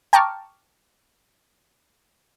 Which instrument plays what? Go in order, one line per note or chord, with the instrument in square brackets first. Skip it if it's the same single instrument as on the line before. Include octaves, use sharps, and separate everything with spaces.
[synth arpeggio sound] G5 A5 A#5 C#6 D6 F6